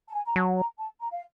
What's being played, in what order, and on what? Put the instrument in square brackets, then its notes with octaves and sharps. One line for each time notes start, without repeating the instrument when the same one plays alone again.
[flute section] A5
G#5
A#5
[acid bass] F#3 [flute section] A5
[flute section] A#5
A5
A#5
F5